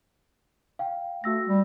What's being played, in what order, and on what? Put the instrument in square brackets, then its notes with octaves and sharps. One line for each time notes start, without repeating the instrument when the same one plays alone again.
[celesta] F5 G5
[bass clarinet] A3 [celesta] F#4 E6 A#6
[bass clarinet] G3